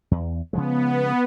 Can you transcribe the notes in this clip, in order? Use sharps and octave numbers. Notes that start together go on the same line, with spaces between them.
E2
C#3 F3 G#3 B3